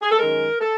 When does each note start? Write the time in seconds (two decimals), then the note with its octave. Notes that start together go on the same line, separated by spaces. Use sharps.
0.02 G#4
0.11 A4
0.19 F#2 D#3 G#3 A#4
0.61 A4